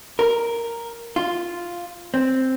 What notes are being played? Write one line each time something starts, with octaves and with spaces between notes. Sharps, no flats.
A#4
F4
C4